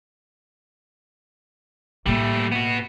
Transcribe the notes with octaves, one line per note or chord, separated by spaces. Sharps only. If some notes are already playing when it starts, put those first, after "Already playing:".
A2 G3 A3 A#3
B3 F#4